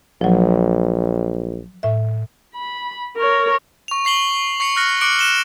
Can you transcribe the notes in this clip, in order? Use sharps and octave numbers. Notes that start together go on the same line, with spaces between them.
A#1 F3 F#3
A2 E5
B5
A#4 C#5
C#6 F7
C#6 C7 F#7 G7
C#6 C7 C#7 F7
F6 F#6 A#6 C#7
D6 F#6 C#7 D7 F#7
F#6 E7 G7